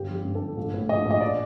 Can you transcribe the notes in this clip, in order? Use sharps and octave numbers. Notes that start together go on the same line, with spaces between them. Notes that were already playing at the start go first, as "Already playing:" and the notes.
Already playing: G1 D3 G4
F3
G4
G2
A4
G1
A#1
A2
A#1 D#5
A#1
D#5
D5